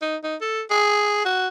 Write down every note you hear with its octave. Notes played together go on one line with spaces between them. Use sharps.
D#4
D#4
A4
G#4
F#4